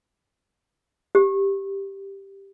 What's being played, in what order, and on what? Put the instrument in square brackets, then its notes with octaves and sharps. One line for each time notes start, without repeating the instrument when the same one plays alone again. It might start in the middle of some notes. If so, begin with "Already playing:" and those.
[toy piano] G4